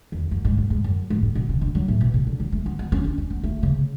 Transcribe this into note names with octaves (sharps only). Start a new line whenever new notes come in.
E2
F#2
G#2
F#2
G#2
F#2
G#2
A2
B2
C#3
D3
F#3
A2
B2
C#3
D3
F#3
A3
B3
B3
C#4
D4
C#4
B3
A3
C#3